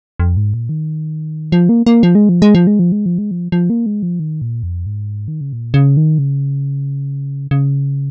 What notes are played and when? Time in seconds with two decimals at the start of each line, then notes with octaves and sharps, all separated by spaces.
0.20 F2
0.37 G#2
0.54 A#2
0.69 D#3
1.52 F3
1.69 A#3
1.86 A#3
2.03 F3
2.15 G#3
2.29 F3
2.42 G#3
2.55 F3
2.67 G#3
2.79 F3
2.92 G#3
3.06 F3
3.18 G#3
3.31 F3
3.52 F3
3.70 A#3
3.86 G#3
4.03 F3
4.20 D#3
4.42 A#2
4.63 F2
4.86 G#2
5.28 D#3
5.41 C#3
5.53 A#2
5.74 C#3
5.97 D#3
6.19 C#3
7.51 C#3